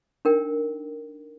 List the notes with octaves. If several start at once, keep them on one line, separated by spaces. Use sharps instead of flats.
D4 D#4 A#4 G5